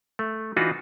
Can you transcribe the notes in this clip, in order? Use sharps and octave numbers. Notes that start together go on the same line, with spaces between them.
A3
E3 D4 D#4 F4 F#4 B4